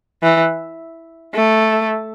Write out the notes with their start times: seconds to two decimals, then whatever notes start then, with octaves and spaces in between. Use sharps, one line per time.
0.23 E3
1.35 A3